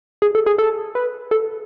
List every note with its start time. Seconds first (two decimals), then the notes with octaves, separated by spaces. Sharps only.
0.22 G#4
0.35 A4
0.46 G#4
0.58 A4
0.95 B4
1.31 A4